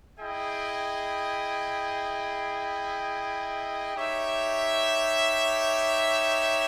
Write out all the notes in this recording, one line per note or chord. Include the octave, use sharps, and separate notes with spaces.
E4 G#4 D#5 G5
D#4 G4 C#5 E5